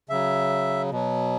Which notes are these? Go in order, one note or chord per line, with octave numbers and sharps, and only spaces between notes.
C#3 F#3 E5
B2 F#3